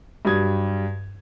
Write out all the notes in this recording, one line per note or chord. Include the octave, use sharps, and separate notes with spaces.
G2 F#3 G3 D#6 G#6